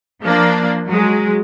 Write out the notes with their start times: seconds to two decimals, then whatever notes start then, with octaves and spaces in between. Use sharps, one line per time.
0.24 F3 A#3 D4
0.87 F#3 G#3